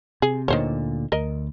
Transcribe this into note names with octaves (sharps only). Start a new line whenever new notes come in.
C3 G#4
D2 A#2 D3 D#3 C5 C#5
D2 A#4 D#5